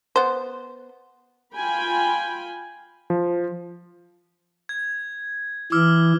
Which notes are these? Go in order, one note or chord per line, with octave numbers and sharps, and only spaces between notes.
B3 C5
F4 G5 G#5 B5
F3
G#6
E3 D6 E6 F6